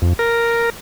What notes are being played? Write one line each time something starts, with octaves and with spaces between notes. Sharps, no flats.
F2
A#4